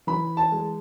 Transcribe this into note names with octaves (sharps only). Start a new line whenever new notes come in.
E3 B5
A5
G#3